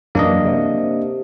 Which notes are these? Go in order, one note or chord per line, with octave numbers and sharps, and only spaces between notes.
F#2 E3 A#3 D4 D#5
C3